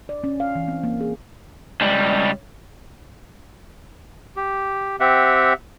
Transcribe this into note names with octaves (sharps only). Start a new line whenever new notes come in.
D5
C#4
F5
E3
C4
A#3
G#4
C#2 G3
G4
C4 G4 E5 F#5